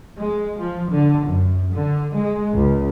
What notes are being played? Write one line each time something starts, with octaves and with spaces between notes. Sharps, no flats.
G#3
F3
D3
F#2
D3
G#3
C#2